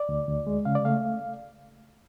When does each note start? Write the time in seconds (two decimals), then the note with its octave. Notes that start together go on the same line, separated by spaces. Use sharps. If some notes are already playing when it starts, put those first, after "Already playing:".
Already playing: D5
0.09 D2
0.28 D2
0.47 G#3
0.65 C#3 F5
0.75 D5
0.85 A3 F5